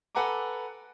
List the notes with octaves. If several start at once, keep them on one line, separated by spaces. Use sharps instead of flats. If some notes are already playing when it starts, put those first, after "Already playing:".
A4 B4 F#5 G#5 A#5 D6